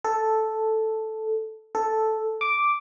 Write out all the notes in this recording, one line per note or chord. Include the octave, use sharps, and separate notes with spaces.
A4
A4
D6